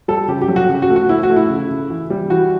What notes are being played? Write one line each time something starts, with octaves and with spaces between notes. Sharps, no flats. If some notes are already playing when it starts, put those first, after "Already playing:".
G3 A4
C#3 G4
G4
F#3
F#4
C#3
F#4
A3
F#4
A3 E4
F#4
A3
E4
C#3
C#3
E3
G3
E3 F#4